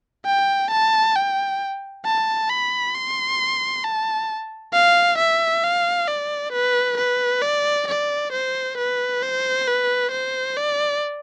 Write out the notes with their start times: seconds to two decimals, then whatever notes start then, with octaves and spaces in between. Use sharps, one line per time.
0.26 G5
0.71 A5
1.16 G5
2.05 A5
2.50 B5
2.94 C6
3.84 A5
4.73 F5
5.19 E5
5.64 F5
6.08 D5
6.53 B4
6.98 B4
7.42 D5
7.88 D5
8.33 C5
8.78 B4
9.23 C5
9.67 B4
10.12 C5
10.57 D5